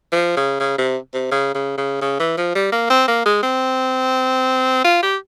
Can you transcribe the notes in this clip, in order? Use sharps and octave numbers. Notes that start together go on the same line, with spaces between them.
F3
C#3
C#3
C3
C3
C#3
C#3
C#3
C#3
E3
F3
G3
A#3
C4
A#3
G#3
C4
F4
G4